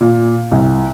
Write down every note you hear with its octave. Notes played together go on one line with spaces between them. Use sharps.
A#2
C2